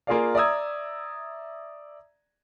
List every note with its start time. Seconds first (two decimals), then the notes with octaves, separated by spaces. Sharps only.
0.07 A#3 F4 G#4 A#4 D5 F5
0.35 D5 E5 A#5 D#6 E6 G#6